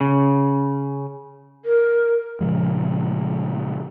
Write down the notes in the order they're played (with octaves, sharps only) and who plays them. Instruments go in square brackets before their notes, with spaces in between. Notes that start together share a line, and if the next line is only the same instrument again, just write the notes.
[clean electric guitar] C#3
[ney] A#4
[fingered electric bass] A#2 C#3 F3 G#3